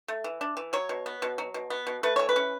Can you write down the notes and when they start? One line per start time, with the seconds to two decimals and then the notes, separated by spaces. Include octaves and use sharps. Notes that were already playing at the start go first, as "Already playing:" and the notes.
0.08 A3
0.24 E3
0.41 D4
0.57 E3
0.73 F#3 C#5
0.89 B2
1.06 B3
1.22 B2
1.38 F#3
1.54 B2
1.70 B3
1.87 B2
2.03 A3 B4
2.16 E3 C#5
2.29 B4
2.36 C#4